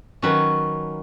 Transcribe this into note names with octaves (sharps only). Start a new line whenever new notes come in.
D#3 F#3 C#4 B4